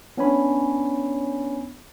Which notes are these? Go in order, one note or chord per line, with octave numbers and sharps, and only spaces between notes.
B3 C#4 D4 C#5 G#5 B5